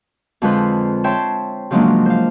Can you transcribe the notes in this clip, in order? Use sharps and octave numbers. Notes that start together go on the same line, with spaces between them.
F2 D3 G#3 F4 B4 C5
C5 C#5 E5 G5 A5 C6
C#3 F3 F#3 G#3 A#3 D4
C5 F5